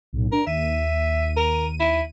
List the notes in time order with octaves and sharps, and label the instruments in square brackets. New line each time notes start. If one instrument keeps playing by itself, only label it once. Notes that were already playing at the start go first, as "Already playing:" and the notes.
[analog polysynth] B1 A2
[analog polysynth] D4 [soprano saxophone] A#4
[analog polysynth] D#2 D#7 [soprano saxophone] E5
[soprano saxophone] A#4
E4